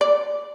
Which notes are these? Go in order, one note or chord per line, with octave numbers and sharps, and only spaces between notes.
D5